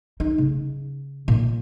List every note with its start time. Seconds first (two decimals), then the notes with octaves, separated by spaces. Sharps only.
0.20 D#4
0.38 C#3
1.28 A#2